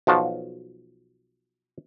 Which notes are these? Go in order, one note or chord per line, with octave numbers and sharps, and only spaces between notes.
B1 F3 F#4 A5